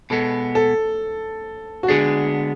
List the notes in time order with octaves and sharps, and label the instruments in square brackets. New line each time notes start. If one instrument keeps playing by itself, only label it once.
[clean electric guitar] B2 G#3 B3 [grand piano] A4
[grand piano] A4
F#4
[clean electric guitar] D3 G#3 B3 D4 [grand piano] G#4